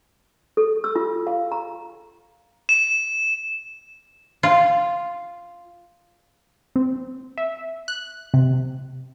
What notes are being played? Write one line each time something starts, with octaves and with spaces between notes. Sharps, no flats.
A4
E6
F4
F5
A#5
E7
F4
C4
E5
F#6
C3